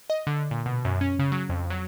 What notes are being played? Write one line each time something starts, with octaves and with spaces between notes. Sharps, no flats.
D#5
D3
A#2
B2
F#2
C#4
C#3
F#3
F2
F#3